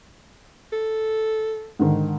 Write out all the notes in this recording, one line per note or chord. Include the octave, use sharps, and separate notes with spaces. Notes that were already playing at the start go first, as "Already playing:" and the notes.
A4
G#2 D3 D#3